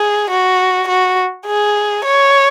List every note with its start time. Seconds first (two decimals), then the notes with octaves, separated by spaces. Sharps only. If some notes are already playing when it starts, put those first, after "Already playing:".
Already playing: G#4
0.30 F#4
0.88 F#4
1.46 G#4
2.05 C#5